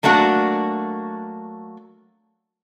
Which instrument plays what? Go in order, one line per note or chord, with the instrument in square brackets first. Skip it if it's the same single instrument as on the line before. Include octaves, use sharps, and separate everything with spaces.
[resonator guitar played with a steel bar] F#3 A3 A#3 D4 F#4